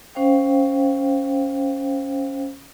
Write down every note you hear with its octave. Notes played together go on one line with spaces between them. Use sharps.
C#4 C5 F5 G5